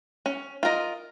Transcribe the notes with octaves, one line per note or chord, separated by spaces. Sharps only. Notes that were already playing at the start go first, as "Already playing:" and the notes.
C#4
F4 A#4 D#5